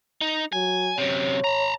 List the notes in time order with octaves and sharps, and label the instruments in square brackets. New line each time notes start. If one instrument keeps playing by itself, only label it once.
[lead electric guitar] D#4
[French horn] F#3 [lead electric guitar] G#5
[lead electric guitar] F#2 C3 [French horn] C#5
[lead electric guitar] A5 A#5